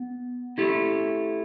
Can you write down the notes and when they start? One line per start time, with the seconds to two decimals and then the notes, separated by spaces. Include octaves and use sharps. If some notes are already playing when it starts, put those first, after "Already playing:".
Already playing: B3
0.58 A3 E4 G4